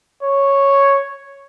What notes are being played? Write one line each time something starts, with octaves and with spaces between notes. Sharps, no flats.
C#5